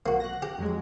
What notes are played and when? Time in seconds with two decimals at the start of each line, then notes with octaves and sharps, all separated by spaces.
0.06 B1 A#3 F#4
0.20 F#6 A#6
0.42 G4
0.58 F2 F#3 G#3